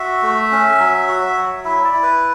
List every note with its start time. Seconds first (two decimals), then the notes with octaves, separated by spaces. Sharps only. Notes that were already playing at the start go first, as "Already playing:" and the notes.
Already playing: F#4 E5
0.23 A3
0.51 C#4
0.79 F#3
1.08 F#4
1.37 F#3
1.65 E4 E5
1.84 D5
1.93 E4
2.03 B4